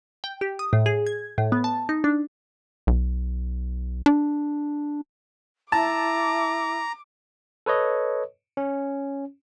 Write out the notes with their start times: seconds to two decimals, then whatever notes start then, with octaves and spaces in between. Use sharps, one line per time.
0.24 G5
0.41 G4
0.59 D#6
0.73 A2
0.86 G#4
1.07 G#6
1.38 A2
1.52 B3
1.64 A5
1.89 D#4
2.04 D4
2.87 B1
4.06 D4
5.72 E4 A5 A#5 D6
7.66 A4 B4 C#5 D#5
8.57 C#4